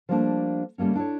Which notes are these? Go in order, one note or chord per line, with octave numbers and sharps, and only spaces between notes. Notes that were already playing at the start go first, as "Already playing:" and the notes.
F3 G3 A3 A#3 C#4 D4
C#3 G3 A3 A#3 C#4
D4 E4 A4 C#5